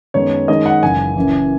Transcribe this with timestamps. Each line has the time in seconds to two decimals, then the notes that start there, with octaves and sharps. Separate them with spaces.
0.14 F#2 D#3 G#3 B3 D#4 C#5
0.48 F#2 D#3 G#3 D#4 D#5
0.66 F#5
0.83 F#1 F#2 C#3 E3 G#5
1.16 F#1 F#2 E3